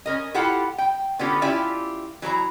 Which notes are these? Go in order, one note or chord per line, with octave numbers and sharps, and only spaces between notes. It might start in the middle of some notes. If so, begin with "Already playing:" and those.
C#4 A#4 D#5
E4 F4 G4 A4 F#5
G5
D3 B3 C#4 F4 G4
C#4 E4 F4 G4 D5 E5
E3 F#3 C5 A#5